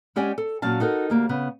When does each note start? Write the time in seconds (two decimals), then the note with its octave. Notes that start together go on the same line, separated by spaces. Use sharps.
0.16 G#3 C#4 G4 D5 F#5 G#5
0.38 A4
0.62 A#2 F#3 C#4 F5 A5
0.80 D#4 F#4 A4 A#4
1.10 D2 A#3 G4
1.29 C#3 B3